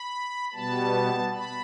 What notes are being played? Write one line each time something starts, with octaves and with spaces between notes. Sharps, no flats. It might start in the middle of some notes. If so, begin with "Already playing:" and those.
Already playing: B5
B2 G3 B3 A5
B5